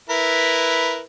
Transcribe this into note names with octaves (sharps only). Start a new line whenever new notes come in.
E4 A#4 B4